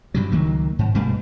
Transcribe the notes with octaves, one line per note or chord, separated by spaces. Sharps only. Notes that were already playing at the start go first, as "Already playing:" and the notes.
G2 C3 F#3
C#2 D#3 F#3 A#3
G#2
G2 B2 G3 A3